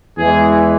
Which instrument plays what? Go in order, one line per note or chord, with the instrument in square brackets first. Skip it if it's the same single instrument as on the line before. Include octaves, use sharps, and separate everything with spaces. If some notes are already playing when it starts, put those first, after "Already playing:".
[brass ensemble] E2 E3 G#3 G#4